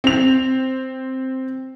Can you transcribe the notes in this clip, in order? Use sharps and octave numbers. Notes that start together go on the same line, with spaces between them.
C4 F7